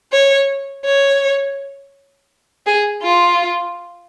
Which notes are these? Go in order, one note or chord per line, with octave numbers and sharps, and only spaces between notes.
C#5
C#5
G#4
F4